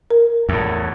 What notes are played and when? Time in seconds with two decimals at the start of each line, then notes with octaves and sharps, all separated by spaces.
0.11 A#4
0.49 E2 A2